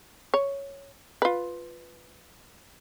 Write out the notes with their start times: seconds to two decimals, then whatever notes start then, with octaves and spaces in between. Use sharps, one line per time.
0.34 C#5
1.22 F4 B4